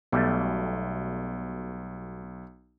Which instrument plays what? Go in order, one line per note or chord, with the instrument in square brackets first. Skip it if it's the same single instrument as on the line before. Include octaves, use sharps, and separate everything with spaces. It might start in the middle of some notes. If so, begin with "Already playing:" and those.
[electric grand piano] B1 [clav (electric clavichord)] B2 G3 A3